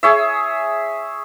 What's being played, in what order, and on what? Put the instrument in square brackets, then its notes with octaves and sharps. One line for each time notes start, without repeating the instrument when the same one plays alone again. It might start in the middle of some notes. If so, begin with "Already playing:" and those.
[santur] G#4 C#5 E5